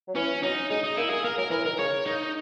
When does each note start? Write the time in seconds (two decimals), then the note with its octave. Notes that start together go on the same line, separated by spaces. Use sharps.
0.08 F#3
0.15 E3 C#4
0.43 F#3 D#4
0.70 G#3 D#4
0.83 D#4
0.97 A#3 E4
1.10 G#4
1.24 A#3 A#4
1.37 F#3 A#4
1.51 E3 A#4
1.65 D#3 A#4
1.78 C#3 C#5
2.06 D#4